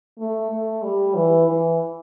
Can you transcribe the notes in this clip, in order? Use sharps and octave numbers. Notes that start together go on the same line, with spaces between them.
A3
A3
G3
E3
E3